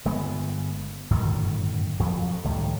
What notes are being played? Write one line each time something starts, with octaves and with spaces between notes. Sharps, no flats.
G1 G#3 B3
G1 F#2 A2 D#3
F2 F3 F#3
C#2 A2 D#3 G3